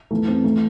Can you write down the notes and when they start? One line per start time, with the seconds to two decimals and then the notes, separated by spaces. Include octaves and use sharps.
0.10 E2 E3 A3
0.28 C4
0.44 E3 A3